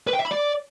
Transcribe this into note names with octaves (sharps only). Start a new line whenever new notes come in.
B4
G5
E5
B5
D5